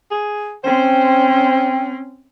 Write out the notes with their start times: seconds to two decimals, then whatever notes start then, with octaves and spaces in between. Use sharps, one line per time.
0.11 G#4
0.64 C4 C#4 C5 G5